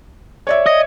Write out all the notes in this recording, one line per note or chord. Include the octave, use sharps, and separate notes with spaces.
C#5 D5 E5
D#5